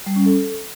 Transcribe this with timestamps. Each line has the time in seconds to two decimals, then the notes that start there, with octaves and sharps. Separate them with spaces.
0.06 G3
0.16 C#4
0.26 A4